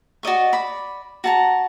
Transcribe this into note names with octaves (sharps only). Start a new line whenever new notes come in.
F#4 D5 D#5 C#6
D5 B5
F#4 A5 A#5